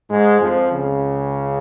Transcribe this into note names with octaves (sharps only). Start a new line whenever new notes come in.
G#2 G#3
F2 F3
C#2 C#3